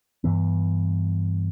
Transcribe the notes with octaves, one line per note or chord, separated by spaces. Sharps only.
G2 E3 B3